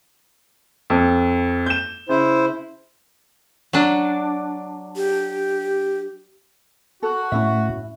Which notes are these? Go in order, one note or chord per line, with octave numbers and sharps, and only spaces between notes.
F2
G6 E7
C#3 E4 C5
F#3 D4
G4
F#4 A4
A2 C#4 E4 E5